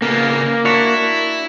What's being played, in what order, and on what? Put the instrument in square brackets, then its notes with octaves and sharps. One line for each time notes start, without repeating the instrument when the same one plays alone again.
[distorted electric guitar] C#3 B3 [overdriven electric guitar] A#3
[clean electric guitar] D4 F#4 C#5 [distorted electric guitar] E4